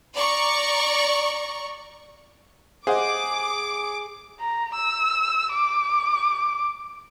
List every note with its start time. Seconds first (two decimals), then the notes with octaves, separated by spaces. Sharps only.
0.16 D5 A#5 C#6
2.87 G#4 C5 D#5 F#5 D6
4.40 A#5
4.75 E6
5.53 D6